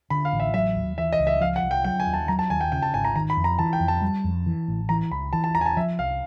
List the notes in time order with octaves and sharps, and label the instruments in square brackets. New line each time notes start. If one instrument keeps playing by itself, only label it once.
[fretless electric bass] D3 [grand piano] B5
[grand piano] F5
[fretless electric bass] A1
[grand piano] E5
[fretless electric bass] F#3 [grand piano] E5
[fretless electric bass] D#2
[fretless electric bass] E3 [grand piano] E5
[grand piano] D#5
[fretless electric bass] C#2
[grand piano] E5
[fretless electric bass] F3 [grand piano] F5
[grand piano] F#5
[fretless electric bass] C2
[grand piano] G5
[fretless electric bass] F#3 [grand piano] G5
[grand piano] G#5
[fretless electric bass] D#2
[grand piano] A5
[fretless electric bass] F#3 [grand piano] A#5
[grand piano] A5
[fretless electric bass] D#2 [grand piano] G#5
[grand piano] G5
[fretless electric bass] C#3 [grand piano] G5
[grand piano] A5
[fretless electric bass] G#1 [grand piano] G#5
[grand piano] A#5
[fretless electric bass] D#3 [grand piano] A#5
[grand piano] B5
[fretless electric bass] F2
[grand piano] A#5
[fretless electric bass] E3 [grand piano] A5
[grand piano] G5
[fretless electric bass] F2
[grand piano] A5
[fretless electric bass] G3
F2
E3
A1
[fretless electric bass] E3 [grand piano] A#5
[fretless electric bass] C#2 [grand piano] B5
[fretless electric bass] E3 [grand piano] A5
[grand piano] A5
[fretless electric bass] E2 [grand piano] A#5
[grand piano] G#5
A5
[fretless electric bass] F3 [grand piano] E5
[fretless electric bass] C2 [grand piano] F5